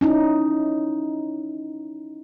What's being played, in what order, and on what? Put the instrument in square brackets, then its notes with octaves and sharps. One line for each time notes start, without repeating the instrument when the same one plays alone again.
[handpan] C#4 D#4 E4